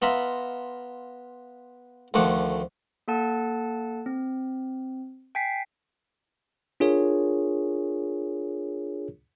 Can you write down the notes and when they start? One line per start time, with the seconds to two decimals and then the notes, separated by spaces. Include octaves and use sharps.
0.02 B3 F4 E5 A#5 B5
2.14 D2 D#3 F3 A3 F#5 D6
3.08 A#3 A4 F#5 A5
4.06 C4
5.35 G5 G#5 B6 C7
6.80 D4 F4 G#4 A#4 C#5